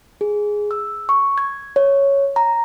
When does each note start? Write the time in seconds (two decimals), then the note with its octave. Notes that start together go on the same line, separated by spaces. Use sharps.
0.21 G#4
0.71 E6
1.09 C#6
1.38 G#6
1.76 C#5
2.36 A#5